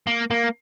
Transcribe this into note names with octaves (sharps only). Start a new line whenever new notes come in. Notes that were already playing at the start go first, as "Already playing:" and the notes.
A#3
A#3